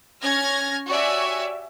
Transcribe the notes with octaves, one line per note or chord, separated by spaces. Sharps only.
C#4 F6 G#6 A#6
F#4 G4 C#5 D5 E5 G#5